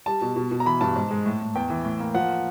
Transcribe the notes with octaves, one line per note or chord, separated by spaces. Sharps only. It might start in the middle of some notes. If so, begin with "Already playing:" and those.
G3 A5
B2
B2
B2
A#5
E3 B5
G2 A5
G#2
G#3
A2
A2
E2 G5
E3
A2
A#3
F3 F#5